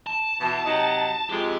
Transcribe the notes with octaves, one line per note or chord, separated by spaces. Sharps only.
A5
B2 E3
C3 F#3 D#4
F2 G#3 G4